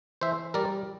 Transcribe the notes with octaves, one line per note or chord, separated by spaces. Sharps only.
E3 C5 E5
G3 A#4 D5